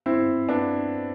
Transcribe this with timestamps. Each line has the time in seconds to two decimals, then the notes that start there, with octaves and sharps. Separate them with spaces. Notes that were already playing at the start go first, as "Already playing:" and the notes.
0.06 C4 E4
0.49 B3 D4